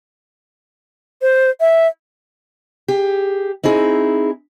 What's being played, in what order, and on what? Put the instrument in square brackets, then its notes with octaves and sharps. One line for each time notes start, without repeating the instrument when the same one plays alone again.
[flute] C5
E5
[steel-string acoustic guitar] G4 G#4
C4 D#4 E4 G#4